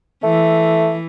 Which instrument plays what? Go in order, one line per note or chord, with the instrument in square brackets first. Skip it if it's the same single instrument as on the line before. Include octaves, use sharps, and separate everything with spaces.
[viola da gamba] E3 [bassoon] A3